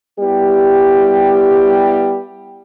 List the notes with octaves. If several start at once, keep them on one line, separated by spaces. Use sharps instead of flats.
G3 B3 E4 G4